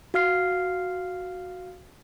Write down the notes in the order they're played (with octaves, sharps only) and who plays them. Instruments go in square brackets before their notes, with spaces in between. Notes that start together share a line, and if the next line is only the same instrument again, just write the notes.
[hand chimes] F#4 F5 F6 C7